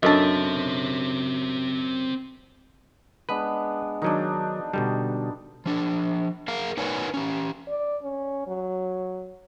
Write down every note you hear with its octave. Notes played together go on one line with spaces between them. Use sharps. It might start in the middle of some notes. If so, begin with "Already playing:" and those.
F#2 C4 D4 A4 D#5 E5 A5
G#3 B3 D4 B4
D#3 F#3 D4 D#4
B2 D3 G3
F3 D4
G#4 A#4 F5
D#4 A#4 B4 C#5 F#5 G#5
C#4 G4
D5
C#4
F#3